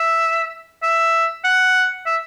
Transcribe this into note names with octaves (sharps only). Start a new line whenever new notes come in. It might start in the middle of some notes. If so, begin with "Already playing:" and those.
Already playing: E5
E5
F#5
E5